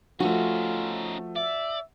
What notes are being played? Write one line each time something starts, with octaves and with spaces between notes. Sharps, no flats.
F3 A3 C#4 D#4 F4 F#4
D5 E5